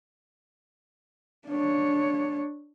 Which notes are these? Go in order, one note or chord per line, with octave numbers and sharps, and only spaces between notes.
D4 C#5